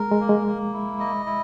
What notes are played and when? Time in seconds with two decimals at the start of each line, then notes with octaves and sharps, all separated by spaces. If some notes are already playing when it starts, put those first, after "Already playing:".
Already playing: G#3 A#4
0.11 G#3
0.20 A#3
0.29 G#3
0.47 A#3
0.73 E4
1.00 D#5
1.26 E4